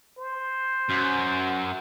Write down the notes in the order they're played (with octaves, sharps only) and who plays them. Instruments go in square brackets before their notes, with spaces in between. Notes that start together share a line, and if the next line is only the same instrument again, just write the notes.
[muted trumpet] C5
[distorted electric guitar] F#2